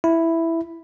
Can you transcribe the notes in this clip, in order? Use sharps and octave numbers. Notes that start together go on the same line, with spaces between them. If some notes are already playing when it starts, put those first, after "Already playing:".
E4